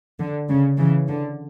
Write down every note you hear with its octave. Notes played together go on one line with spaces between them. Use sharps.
D3
C#3
C#3 E3
D3